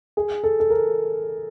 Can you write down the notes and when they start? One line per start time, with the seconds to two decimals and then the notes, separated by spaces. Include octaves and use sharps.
0.17 G#4
0.43 A4
0.60 A4
0.70 A#4